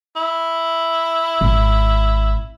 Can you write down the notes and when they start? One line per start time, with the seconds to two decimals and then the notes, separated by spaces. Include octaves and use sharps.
0.16 E4
1.41 G#1